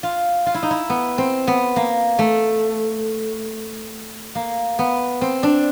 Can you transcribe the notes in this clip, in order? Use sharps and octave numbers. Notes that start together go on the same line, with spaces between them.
F4
F4
E4
D#4
E4
B3
C4
B3
A#3
A3
A#3
B3
C4
D4